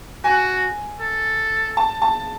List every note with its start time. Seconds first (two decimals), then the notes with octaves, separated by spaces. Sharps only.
0.24 F#4 G#5
1.00 A4
1.77 A5
2.02 A5